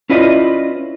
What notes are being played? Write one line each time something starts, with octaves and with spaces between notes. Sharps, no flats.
C#4 E4 F4 B4 D5 D#5